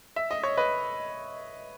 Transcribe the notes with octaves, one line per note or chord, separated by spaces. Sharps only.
E5
D#5
C#5
B4 D#5